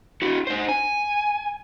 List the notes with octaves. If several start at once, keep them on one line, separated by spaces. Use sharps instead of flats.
E4 F#4
D#4 C5
G#5